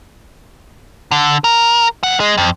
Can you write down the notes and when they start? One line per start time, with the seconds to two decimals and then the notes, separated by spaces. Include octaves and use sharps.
1.11 D3
1.44 A#4
2.03 F2 F#5
2.20 G#3
2.38 F2